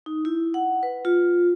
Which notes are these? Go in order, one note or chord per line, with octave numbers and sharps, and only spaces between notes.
D#4
E4
F#5
B4
F4